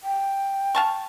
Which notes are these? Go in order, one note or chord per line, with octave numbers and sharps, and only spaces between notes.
G5
F5 A5 C#6